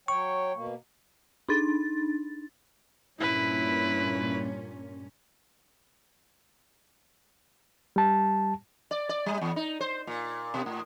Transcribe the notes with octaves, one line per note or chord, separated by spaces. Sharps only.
F#3 C#5 G5 C#6
B2 A#3
D4 D#4 A6
G2 A#2 C#4 E4 B4
G3 A5
D5
D5
G3
E2
D#4
C5
A#2
B2
A2